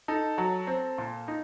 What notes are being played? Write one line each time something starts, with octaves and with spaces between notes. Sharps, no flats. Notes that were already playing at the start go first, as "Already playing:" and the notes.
D#4 A4
F#3
C4
A#2
D#4